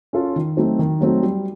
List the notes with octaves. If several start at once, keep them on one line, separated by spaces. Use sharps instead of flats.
C#4 F4 A4
D#3
F#3 A3 C4 D#4
D#3
F#3 A3 C4 D#4
G3